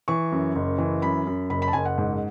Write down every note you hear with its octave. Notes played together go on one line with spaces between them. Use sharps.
E3 C#6
F#2
F#1
E3
F#2 B5
F#2
F#1 B5
B5
A5
F#1 G#5
F#5
G#2